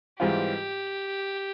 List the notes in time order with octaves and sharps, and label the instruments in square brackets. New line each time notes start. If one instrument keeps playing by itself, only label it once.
[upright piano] G#2 E3 G3 C4 F4 [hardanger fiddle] G4